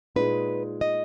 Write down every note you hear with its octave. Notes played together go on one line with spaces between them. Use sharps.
A#2 G#3 D#4 B4
D#5